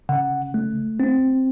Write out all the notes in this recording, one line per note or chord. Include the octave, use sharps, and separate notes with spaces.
C#3 F#5
A3
C4